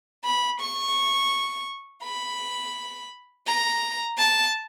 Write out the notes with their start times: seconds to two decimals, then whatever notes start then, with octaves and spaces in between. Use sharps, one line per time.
0.24 B5
0.61 C#6
2.04 B5
3.46 A#5
4.18 A5